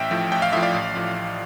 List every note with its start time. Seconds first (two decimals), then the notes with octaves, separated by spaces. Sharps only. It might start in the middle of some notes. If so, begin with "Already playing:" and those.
Already playing: A1 E5 G5
0.11 A2 F3
0.32 A1 G5
0.42 F5
0.53 A2 F3 E5
0.63 D5 F5
0.74 A1
0.95 A2 F3
1.16 A1